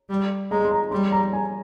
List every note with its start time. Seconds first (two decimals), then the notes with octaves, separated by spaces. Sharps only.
0.09 G3
0.51 G#3 A#5
0.65 C6
0.71 A#5
0.91 G3 C6
1.12 A#5
1.33 G#5